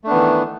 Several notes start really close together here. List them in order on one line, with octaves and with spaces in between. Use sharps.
A3 D4 B3 E3 D#3